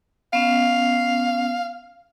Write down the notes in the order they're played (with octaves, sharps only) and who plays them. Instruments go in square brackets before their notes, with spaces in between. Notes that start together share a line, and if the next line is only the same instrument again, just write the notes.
[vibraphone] B3 C#4 [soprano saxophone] F5